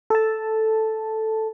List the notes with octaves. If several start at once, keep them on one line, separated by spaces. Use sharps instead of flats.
A4 A5